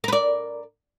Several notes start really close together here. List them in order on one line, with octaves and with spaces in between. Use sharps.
A#4 B4 D5